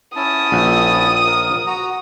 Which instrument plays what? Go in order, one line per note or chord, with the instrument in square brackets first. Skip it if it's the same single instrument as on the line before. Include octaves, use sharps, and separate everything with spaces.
[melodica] C#4 E4 A5 [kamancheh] D#6
[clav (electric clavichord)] A#1
[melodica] A#4
F#4 A#5